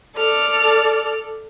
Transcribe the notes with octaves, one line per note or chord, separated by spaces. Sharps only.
A4 D5 F6